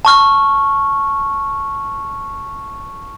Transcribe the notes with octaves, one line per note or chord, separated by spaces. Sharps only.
A5 C#6 F6